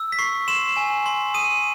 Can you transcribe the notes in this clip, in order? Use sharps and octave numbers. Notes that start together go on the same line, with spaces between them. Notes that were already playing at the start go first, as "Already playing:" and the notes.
Already playing: E6
B6
C#6 C7
C6 E7
G#5
C6
D#6 D#7